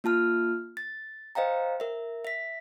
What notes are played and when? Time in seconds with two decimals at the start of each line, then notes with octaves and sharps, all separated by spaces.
0.04 A#3 F4 A5 F6
0.77 A6
1.35 C5 D#5 F5 G5 A#5
1.80 A#4 E5
2.25 E5 B6